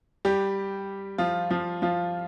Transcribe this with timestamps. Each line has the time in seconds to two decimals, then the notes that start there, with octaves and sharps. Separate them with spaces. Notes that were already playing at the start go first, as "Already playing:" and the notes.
0.25 G3 G4
1.18 F3 F4
1.51 F3 F4
1.82 F3 F4